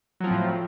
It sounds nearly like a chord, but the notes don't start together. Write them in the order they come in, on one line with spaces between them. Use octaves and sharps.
F#3 F3 C4 A2